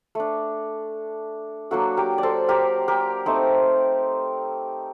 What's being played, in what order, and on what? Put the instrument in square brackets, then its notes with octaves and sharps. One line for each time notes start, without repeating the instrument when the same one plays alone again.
[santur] A3 D4
F#3 A#3 D4 F#4 A4
G4 A#4
D5
A4 C5
G4 A#4
G4 A#4
A3 C4 D#4